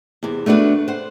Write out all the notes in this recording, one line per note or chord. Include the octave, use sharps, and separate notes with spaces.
E2 C3
A3 B3 D4 F#4 B4
C5 F#5